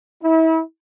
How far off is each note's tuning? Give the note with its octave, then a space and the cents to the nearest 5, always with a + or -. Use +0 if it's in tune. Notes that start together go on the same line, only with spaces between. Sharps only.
E4 -35